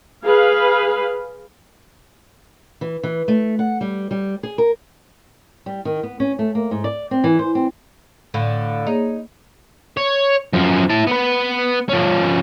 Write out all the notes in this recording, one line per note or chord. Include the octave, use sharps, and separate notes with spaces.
G#4 B4 F5
E3
E3
A3
F#5
G3
G3
G#4
A#4
G3
D#3
B3
C#4
A3
A#3
G#2
D5
C4
E3
C5
C4
A2 D3 F5
A#3 D#4 G#4 C#5
C#5
F#2 F3
E4 A5
B3 B4
F3 C#4